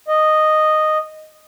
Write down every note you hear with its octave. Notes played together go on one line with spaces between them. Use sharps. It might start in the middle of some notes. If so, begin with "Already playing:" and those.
D#5